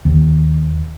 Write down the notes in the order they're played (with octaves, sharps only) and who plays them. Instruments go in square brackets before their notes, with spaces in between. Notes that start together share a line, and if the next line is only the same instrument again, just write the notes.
[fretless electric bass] D#2